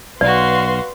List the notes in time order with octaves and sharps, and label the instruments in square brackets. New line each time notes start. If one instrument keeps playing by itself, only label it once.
[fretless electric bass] B1 [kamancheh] F#4 F5 [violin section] B4 C6 [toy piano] D5